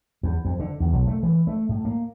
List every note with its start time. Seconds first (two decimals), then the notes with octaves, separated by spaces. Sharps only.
0.23 E2
0.45 F2
0.60 D3
0.80 E2
0.92 B1
1.07 A3
1.23 E3
1.47 A3
1.69 A2
1.85 A#3